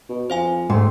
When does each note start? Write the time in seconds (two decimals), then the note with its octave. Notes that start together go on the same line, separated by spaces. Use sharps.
0.09 B2
0.30 F2 C5 F5 G#5
0.70 D2 G#2 A3 G#4 C5 G5